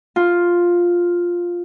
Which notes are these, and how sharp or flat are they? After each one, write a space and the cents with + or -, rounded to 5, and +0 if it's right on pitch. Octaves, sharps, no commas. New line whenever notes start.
F4 +5